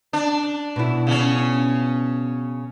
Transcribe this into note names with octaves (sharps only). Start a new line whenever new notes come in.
D4
B2 E4
C#3 C#4